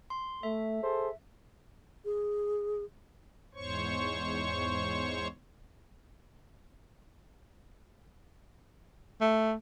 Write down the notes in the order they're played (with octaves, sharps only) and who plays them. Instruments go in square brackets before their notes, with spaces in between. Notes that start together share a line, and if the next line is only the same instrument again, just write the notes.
[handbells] C6
[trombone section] A3 [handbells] E5
[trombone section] G#4 A4 C5
[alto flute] G#4
[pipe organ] E2 G#2 C5 C#5 C#6
[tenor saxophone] A3